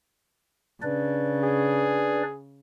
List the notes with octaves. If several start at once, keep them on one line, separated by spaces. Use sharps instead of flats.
C#3 D4 B4 D5
G#4